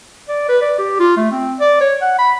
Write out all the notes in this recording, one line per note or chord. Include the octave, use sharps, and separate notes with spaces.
D5
B4
D5
G4
F4
A3
C4
D5
C#5
F#5
B5